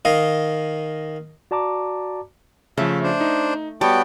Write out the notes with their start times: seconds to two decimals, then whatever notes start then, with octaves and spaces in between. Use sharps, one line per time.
0.05 D#3 D#5 F5
1.51 F#4 D5 A5 A#5 D6
2.78 C#3 F3 A3 E5
3.03 D4 C5
3.21 D#4
3.81 G3 B3 F#4 C#5 G5 A5